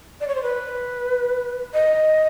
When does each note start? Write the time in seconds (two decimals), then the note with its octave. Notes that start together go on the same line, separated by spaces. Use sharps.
0.21 D5
0.28 C#5
0.35 C5
0.43 B4
1.74 D#5